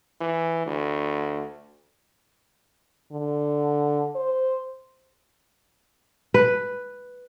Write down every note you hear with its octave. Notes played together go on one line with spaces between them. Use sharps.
E3
D2
D3
C5
B4